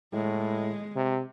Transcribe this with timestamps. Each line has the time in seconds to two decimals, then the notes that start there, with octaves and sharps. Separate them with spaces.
0.14 A2 G#3
0.96 C3